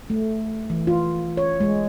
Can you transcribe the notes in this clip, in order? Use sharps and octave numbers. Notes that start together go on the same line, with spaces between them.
A3
E3
F4
C#5
G#3